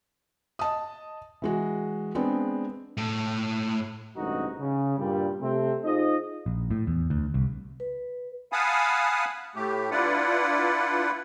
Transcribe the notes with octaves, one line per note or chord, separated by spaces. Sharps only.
D#5 A5 D#6
E3 G#3 F#4
G#3 B3 C4 D4
A2
A1 G2 C3 G#3 D#4 F#4
C#3
G2 A#2 G3
C3 A3 C4
D#4 F4 G#4 C5 D#5
A#1
A2
E2
D2
C2
B4
F5 F#5 G#5 A5 B5 D#6
A2 A3 G4
D4 E4 F4 B4 D5 F#5